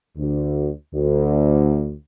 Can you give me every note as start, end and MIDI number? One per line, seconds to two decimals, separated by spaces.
0.18 0.70 38
0.94 1.93 38